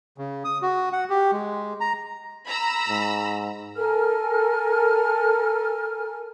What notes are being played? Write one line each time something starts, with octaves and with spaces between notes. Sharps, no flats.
C#3
D#6
F#4
F#5
G4
G#3
A#5
A#5 B5 E6
G#2
A4 A#4 G#5 F6